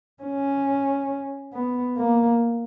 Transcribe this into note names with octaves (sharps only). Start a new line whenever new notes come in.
C#4
B3
A#3